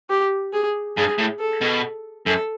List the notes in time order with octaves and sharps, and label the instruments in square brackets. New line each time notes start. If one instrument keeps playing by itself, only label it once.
[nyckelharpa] G4
G#4
[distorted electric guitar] G2 [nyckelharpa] G#4
[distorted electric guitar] A2
[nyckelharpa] A4
[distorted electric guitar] B2
[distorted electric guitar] F#2 [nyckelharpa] A4